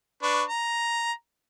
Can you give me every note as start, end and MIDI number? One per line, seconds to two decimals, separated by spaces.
0.23 0.43 62
0.23 0.43 71
0.23 0.43 85
0.48 1.12 82